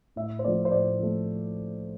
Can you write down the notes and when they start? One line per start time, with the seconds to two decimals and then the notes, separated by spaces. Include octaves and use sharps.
0.16 A2 E5
0.39 C5
0.44 F3 A3 D5
0.65 C5
0.72 A2 D5
0.99 F3 A3